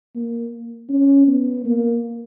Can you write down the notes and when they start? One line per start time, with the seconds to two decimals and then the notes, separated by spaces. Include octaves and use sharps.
0.15 A#3
0.90 C#4
1.28 B3
1.65 A#3